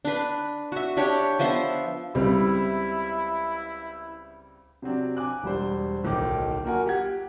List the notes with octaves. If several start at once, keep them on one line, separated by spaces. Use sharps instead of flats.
D4 B4
F#4 E5
D4 G4 C#5
F3 B3 E5 C6
C#2 G3 C4 E4
C3 F#3 C4 D4
G#5 D6 F#6
E1 G3 C5
D1 B1 D#3 D6
A#3 F4 F#4 A#4 F#5 G#5
G4 F#5 G#6